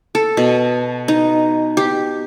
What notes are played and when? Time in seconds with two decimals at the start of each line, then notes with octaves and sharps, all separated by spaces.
0.15 A4
0.37 B2
1.08 D#4
1.77 G4